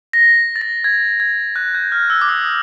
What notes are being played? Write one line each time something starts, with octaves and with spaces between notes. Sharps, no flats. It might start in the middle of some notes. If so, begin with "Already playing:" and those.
A#6
A6
A#6
G#6
G#6
F#6
G6
F6
E6
D6
D#6